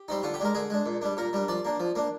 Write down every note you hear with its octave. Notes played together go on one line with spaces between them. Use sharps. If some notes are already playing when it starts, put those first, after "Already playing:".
Already playing: G4
G3 C4 D#4
D3 F4
G4
G#3 D4 A#4
D3 G#4
G#3 D4
A#2
G3 D4
A#2 A#4
G3 D4
F3 D5
A#3 D4
F3
A#3 D4